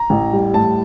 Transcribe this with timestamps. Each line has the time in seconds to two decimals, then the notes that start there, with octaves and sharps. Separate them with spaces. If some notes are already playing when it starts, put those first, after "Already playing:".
Already playing: A#5
0.10 A1
0.33 G3
0.54 A2 A5